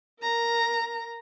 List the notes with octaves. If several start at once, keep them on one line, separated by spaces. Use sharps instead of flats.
A#4 A#5